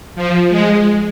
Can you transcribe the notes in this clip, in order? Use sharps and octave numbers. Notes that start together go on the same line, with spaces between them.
F3
G#3